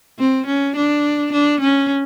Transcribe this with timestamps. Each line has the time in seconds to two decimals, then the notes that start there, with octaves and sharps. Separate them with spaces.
0.19 C4
0.47 C#4
0.76 D4
1.32 D4
1.60 C#4